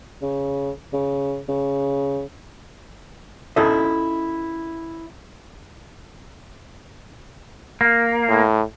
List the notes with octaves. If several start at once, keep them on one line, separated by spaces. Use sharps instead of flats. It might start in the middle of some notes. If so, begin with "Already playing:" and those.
C#3
C#3
C#3
C#4 E4 F4 A4 D#5 E5
A#3
A2